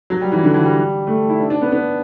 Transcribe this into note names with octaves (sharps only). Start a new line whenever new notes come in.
F#3
G3
E3
D3
E3
G3
A3
E4
D4
D4
B3
B3